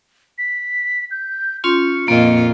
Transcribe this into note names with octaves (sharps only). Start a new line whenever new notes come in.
B6
G6
C#4 F4 C6 C#7
F2 A#2 A#3 F4 D#5